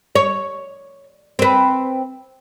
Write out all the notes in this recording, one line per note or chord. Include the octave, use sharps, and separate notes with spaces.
C#5
C4 B4